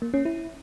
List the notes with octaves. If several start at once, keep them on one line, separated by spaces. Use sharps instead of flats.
A#3
C#4
E4